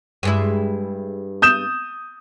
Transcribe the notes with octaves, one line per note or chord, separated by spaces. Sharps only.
G2 G#3 E4
D#6 G6 E7